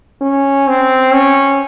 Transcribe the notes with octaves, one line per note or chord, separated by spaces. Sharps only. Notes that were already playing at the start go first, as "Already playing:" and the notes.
C#4
C4
C#4